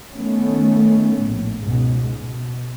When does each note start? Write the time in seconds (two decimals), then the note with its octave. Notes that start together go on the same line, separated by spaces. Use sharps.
0.13 D#3 A3 B3 C#4
1.23 A#1 A2
1.64 C#2 G#2 B2
2.16 B2